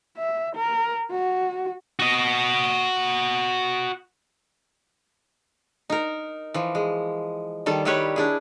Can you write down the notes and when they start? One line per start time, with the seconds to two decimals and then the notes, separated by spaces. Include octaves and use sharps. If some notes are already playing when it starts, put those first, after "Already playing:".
0.17 E5
0.55 A#4
1.11 F#4
1.99 F#4 D#5
5.90 D#4 A#4
6.54 E3 F3
6.75 G#3
7.66 D#3 G3 A4
7.85 D#3 G3 E4 G4 B4 C#5
8.16 D4 E4 G#4